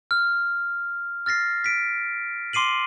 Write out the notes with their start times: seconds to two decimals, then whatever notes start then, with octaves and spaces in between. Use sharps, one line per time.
0.11 F6
1.26 F6 A6 A#6 C7
1.64 B6 D7
2.53 C6 D6 C7 D#7 F#7